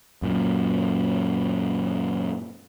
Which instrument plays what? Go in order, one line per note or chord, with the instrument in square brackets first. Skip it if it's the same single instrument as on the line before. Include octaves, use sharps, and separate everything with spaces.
[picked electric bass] F#2 A#2